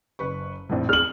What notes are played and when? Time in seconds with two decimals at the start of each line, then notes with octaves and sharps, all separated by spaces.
0.19 F#1 B4 C#6
0.69 A#1 F2 A2
0.89 G#4 F6 F#7